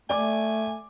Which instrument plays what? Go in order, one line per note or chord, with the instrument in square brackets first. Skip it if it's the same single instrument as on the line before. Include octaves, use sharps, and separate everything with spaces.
[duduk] A3 [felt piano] D5 D6 [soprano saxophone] G#5